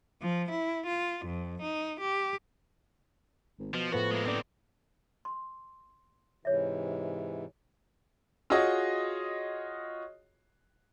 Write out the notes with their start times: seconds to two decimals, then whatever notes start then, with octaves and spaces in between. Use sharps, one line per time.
0.21 F3
0.51 E4
0.86 F4
1.26 F2
1.62 D#4
2.00 G4
3.59 G#1
3.74 B2 F3
3.92 A2 F3 B3 F#4 B4
4.11 G#3 A#3
4.25 F#1 C4 D#4 G4 D5
5.25 C6
6.45 G#2 C3 E3 C#5 E5
8.50 F4 F#4 G#4 C#5 D#5